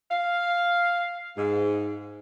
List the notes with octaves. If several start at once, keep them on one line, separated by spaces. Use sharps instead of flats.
F5
G#2